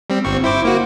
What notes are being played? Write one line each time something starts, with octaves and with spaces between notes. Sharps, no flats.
G3 C4
G1 C4 C#6
E4 C5 D6
A#3 F#4